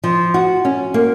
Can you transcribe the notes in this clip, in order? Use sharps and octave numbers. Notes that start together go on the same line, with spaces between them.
F3
F#4
C#4
A#3